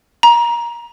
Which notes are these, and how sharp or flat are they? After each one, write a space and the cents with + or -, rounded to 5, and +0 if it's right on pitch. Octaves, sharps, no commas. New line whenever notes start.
A#5 +20